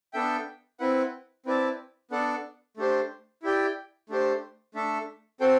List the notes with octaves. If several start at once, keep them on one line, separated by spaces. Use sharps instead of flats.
B3 D4 A4 E5 G5
C4 E4 B4 F#5
C4 E4 B4 D5 A5
B3 D4 A4 D5 F#5
A3 D4 G4 C5
E4 G4 D5 G5
A3 D4 G4 C5
A3 D4 A4 E5
C4 F#4 A4 C5 G5